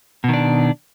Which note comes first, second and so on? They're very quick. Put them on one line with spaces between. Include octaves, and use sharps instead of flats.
B2 D#3 D4